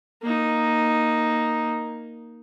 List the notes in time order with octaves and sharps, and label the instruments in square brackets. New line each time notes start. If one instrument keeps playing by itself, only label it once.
[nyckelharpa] A#3 D#4